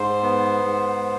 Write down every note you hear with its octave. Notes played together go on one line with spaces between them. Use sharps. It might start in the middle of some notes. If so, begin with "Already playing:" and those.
Already playing: G#2 C5
B3
G#2